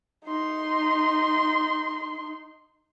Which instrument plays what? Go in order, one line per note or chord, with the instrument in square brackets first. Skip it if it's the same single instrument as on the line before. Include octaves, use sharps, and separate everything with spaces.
[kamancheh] D#4 C6